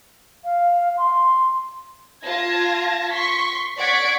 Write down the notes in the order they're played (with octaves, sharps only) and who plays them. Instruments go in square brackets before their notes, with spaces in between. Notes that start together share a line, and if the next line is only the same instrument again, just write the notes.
[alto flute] F5
C6
[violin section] F4 A5 G#6 A#6
C6 C#6 B6
D5 F#5 C#6 G#6 B6 D7